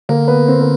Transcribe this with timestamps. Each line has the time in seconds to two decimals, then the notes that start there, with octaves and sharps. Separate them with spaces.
0.09 D3 A#3 A#4
0.28 B3 B4
0.48 C4 C5
0.61 A#4